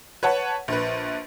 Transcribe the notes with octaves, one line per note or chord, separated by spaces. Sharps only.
B4 C#5 F#5 A5
A#1 B4